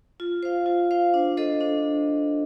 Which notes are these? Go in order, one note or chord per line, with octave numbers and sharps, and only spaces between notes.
F4
C5 F5
F4
C5 F5
D4
A4 C5 D#5
D4